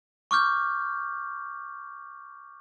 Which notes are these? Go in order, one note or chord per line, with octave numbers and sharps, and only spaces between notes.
C#6 D6 F6 G6